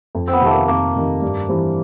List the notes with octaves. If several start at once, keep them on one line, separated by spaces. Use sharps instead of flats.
F2
C4
B3
C3 D#3 A3
A#3
F2 A#3
C3 D#3
G2
E3 G3 C4